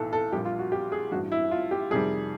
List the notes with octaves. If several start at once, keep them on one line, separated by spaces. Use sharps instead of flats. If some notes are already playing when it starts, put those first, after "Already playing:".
Already playing: B1 A2 E3 A4
A4
A#1 A#2 G3 G4
F4
F#4
G4
G#4
A1 G2 E3 G3 F#4
E4
F4
G4
F2 C3 D#3 G3 G#4